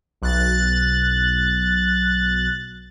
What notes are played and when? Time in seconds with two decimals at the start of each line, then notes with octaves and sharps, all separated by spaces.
0.22 B1 F#6 A6